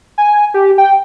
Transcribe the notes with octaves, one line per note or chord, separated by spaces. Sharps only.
G#5
G4
G5